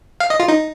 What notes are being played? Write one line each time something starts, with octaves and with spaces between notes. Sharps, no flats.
F5
D#5
F4
D#4